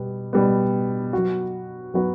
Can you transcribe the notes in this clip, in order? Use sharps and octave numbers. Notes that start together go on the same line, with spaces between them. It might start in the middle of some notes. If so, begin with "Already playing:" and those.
Already playing: B2 G3 B3
B2 G3 B3
F#3 B3 F#4
F#3 B3 F#4